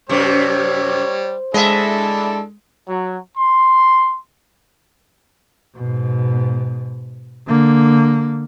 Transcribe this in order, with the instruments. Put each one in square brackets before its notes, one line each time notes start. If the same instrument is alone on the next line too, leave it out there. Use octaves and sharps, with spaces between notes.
[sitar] F#2 C3 [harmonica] G3 C#5 [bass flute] C5
[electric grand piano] G#3 [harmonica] D4 E4 A4 [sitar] D#5 E5
[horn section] F#3
C6
[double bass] G#2 B2
D3 A#3